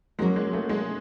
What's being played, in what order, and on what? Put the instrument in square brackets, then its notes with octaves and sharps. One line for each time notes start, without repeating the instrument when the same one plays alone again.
[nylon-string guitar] F#3 A#3 C#4 F#4 A#4 [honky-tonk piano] G#3
[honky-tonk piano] G#3
A3
G#3